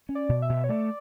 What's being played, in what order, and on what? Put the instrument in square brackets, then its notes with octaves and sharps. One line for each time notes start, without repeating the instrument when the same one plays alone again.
[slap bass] C#4
[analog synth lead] D5
[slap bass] B2
[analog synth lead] E5
[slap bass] B2
[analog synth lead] C#5
[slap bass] A3 [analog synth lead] D5